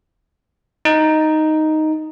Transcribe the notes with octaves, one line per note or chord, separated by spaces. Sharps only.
D#4